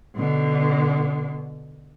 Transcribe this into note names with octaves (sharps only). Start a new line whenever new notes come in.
B2 D3